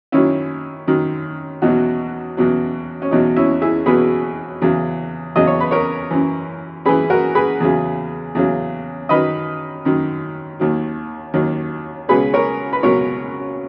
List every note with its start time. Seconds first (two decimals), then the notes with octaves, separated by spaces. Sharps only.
0.12 F#2 D#3 F#3 C#4 E4
0.87 F#2 D#3 F#3
1.62 E2 B2 F#3 D#4 F#4
2.37 E2 B2 F#3
3.02 C#4
3.11 E2 B2 F#3 D#4
3.36 C#4 E4
3.62 E4 G#4
3.86 E2 B2 F#3 G#4 B4
4.61 E2 C#3 F#3
5.36 E2 C#3 F#3 D#5
5.47 C#5
5.60 B4
5.71 A#4 C#5
6.11 F#2 E3
6.85 F#2 E3 G#4 B4
7.10 F#4 A#4
7.35 G#4 B4
7.60 E2 C#3 F#3
8.35 E2 C#3 F#3
9.09 F#2 D#3 F#3 B4 D#5
9.85 F#2 D#3 F#3
10.60 D#2 D#3 F#3
11.34 D#2 D#3 F#3
12.09 C#2 B2 F#3 G#4 B4
12.34 A#4 C#5
12.73 B4
12.83 C#2 B2 F#3 A#4 C#5